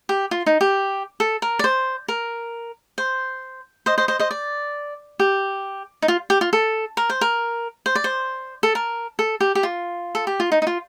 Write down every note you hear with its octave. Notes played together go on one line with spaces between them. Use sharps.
G4
F4
D#4
G4
A4
A#4
D5
C5
A#4
C5
C5 D#5
C5 D#5
C5 D#5
C5 D#5
D5
G4
D#4
F4
G4
F4
A4
A#4
C5
A#4
C5
D5
C5
A4
A#4
A4
G4
G4
F4
A4
G4
F4
D#4
D#4
F4